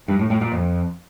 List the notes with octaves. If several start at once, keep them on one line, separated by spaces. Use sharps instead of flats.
G2
A2
A2
A#2
F2